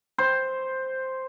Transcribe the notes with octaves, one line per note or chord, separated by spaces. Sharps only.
C5